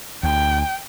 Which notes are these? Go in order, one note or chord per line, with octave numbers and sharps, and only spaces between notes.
D2 G5